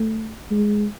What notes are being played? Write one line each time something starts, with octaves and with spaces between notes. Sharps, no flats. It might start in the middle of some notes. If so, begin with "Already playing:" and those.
Already playing: A3
G#3